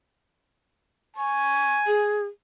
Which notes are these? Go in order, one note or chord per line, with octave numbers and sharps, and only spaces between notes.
G#5 C#6
G#4